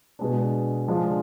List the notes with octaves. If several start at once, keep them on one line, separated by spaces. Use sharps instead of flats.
B2 G#3 D4
F3 G#3 D4